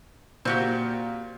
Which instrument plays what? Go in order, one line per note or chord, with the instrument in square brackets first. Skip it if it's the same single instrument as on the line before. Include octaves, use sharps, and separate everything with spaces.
[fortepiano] A#2 [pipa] C4 F#4 G4